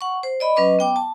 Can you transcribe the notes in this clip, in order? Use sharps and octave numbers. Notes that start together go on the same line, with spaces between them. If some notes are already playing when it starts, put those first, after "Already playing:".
F#5 C#6
C5
D5 D#5 B5
F#3 C#4 B4 D#5 D6
B3 G5 D6
A5